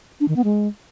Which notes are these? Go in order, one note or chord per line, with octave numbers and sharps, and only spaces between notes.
D4
D#3
B3
G#3